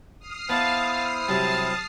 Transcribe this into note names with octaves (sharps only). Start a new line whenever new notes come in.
D#6 F6 C7
B3 D4 E4 C5 F5 A5
C3 F#3 G3 A5